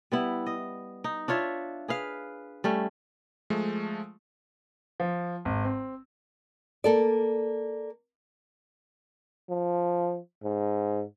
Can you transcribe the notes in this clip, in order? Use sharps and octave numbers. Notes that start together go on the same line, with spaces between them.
G3 B3 E4
D#5
D#4
D4 F4 C#5 E5
G#4 B4 F5
G3 A3 C#4
F3 G#3 A3
F3
G#1
C4
A#3 A4 D5
F3
G#2